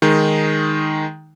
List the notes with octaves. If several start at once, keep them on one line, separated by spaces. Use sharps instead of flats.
D#3 G#3 D#4